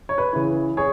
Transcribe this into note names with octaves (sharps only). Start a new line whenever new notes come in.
C#5
B4
C#3 E3
G#4 C#5